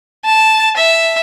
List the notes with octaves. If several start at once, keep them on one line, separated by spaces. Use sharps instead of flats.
A5
E5